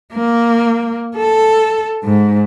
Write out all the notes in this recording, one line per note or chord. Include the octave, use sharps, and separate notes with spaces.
A#3
A4
G#2